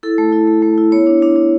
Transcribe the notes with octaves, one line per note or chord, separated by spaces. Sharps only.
E4 A4
A3
E4
A3
A3
E4
B3 C#5
D4
D4
D4